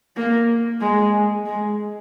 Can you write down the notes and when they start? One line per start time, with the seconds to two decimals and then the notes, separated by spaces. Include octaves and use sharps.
0.17 A#3
0.81 G#3
1.46 G#3